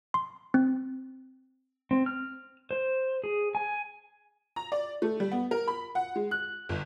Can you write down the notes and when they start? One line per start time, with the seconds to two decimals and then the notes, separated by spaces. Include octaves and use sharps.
0.14 C6
0.54 C4
1.91 C4
2.06 F6
2.71 C5
3.24 G#4
3.55 G#5
4.56 A#5
4.72 D5
5.02 A3
5.20 G3
5.32 B3
5.51 A#4
5.68 B5
5.95 F#5
6.16 G#3
6.31 F#6
6.69 G1